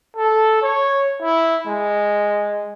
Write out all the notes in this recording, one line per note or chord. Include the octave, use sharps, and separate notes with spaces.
A4
C#5
E4
G#3